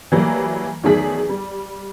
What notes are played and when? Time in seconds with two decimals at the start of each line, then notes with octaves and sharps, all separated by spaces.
0.12 E3 F#3 G3 A3 A#3
0.83 E2 D#3 F#3 A3 G#4 B6
1.29 G3